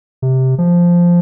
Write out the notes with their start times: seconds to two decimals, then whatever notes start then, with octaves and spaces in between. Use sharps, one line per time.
0.22 C3
0.58 F3